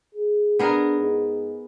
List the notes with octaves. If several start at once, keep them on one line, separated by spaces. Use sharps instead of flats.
G#4
B3 D4 G#4 A#4
G#2